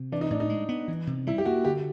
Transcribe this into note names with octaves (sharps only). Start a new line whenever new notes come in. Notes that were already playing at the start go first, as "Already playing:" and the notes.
Already playing: C3
E3 D4
D#4
A2 D4
D#4
G#3
B3
E3
C3
G3 E4
G4
A#3 F#4
D3 G4